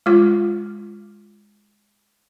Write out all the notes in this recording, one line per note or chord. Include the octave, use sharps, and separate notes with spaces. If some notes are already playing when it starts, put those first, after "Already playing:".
G#3 F4